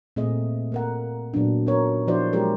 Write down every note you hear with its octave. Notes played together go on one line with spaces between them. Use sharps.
A#2 A3 C4 G#4 D#5
A#3 A#4 F#5
A#2 F#3 B3 D4
B3 D#4 F#4 A#4 C#5
F3 D4 E4 F#4 C5 D5
F#3 G#3 G4 G#4 A#4 C#5